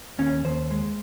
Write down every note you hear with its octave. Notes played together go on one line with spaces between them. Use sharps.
D#2 C#4
D#2 C5
G#3